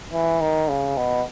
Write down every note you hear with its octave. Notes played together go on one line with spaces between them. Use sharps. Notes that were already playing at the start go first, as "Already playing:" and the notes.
E3
D#3
C#3
B2